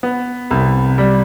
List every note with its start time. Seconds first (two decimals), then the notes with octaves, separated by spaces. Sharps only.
0.03 B3
0.51 C2
0.98 G3